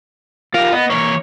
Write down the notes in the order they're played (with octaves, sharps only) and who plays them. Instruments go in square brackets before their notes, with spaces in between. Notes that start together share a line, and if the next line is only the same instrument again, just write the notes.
[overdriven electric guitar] F4 G4 [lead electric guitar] A#4
[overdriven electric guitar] B3 [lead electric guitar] D#5
[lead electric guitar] E3 A#3 [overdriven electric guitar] C#5